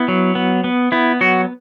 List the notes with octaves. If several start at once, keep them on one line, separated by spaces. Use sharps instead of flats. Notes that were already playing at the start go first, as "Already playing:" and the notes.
Already playing: B3 E4
F#3
B3
B3
B3 E4
F#3 F#4